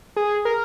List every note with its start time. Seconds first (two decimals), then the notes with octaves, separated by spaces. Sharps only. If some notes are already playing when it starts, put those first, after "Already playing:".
0.16 G#4
0.45 A#4